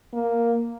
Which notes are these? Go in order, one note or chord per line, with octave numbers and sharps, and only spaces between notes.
A#3